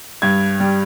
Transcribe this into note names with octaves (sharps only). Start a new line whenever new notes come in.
G2 G#6
G3